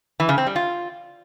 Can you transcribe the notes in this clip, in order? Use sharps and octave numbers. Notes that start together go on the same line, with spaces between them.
E3
C#3
C4
G3
F4